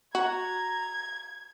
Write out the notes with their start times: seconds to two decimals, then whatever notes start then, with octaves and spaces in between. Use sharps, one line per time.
0.15 F#4 A#5 G#6